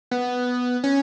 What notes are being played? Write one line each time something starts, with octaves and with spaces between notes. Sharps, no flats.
B3
C#4